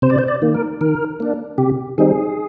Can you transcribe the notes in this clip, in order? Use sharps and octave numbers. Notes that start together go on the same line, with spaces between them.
C3 C5
D5
C5
D5
D#3 A#3
A#4
D#3 A#4
A#3 D4
C3 G4
D#3 G3 C4 D#4 G#4